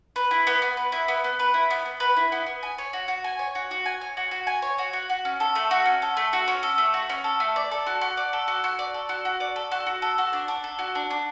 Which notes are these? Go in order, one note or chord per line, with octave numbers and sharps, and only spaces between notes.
B4
E4
B3
B3
B4
E4
B3
B3
B4
E4
B3
B3
B4
E4
B3
B3
G#5
C#5
F#4
F#4
G#5
C#5
F#4
F#4
G#5
C#5
F#4
F#4
G#5
C#5
F#4
F#4
F#4
C#4
A4
A3
F#4
C#4
A4
A3
F#4
C#4
A4
A3
F#4
C#4
A4
A3
D5
A4
F#4
F#4
D5
A4
F#4
F#4
D5
A4
F#4
F#4
D5
A4
F#4
F#4
A4
F#4
D4
D4
A4
F#4
D4
D4